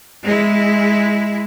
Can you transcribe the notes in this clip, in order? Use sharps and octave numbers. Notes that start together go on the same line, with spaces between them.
G#3 E4